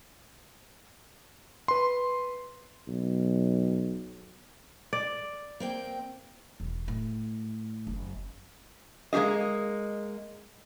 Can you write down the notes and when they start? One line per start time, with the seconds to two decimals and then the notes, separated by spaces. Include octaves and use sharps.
1.68 B4 C6
2.88 B1
4.93 D5
5.60 A#3 C4 G5
6.60 E1
6.88 A2
7.87 F#1
9.13 G#3 A#3 G4 G#4 D#5